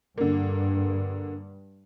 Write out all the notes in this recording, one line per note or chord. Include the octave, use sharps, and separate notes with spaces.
G2 D3 A#3